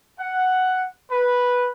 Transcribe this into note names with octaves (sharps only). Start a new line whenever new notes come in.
F#5
B4